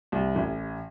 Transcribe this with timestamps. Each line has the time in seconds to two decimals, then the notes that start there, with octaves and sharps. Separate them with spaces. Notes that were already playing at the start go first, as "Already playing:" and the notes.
0.12 C2
0.36 A1